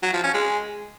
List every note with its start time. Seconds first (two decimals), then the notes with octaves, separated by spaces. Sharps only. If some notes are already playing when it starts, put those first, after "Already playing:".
0.02 F#3
0.13 F3
0.23 C#4
0.34 G#3